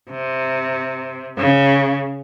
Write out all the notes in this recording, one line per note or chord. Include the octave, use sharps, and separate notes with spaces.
C3
C#3